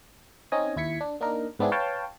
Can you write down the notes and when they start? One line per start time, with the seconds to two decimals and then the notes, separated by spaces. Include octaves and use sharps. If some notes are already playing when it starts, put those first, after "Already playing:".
0.52 C4 C#4 D#4 D#5 G#5
0.76 D#2 E4 G#6 B6 C#7
1.01 D4
1.20 A#3 D4 D#4 A#4
1.59 G#2 B3 C4 D4 E4 G#4
1.72 B4 C#5 F5 G5 A5